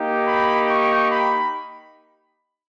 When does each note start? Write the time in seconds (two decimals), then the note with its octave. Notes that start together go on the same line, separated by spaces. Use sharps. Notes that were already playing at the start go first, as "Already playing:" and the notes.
Already playing: A#3 D#4 G4
0.27 B5
0.69 C#6
1.09 B5